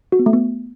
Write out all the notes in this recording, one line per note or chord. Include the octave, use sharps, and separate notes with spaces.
F#4
B3
A3
B3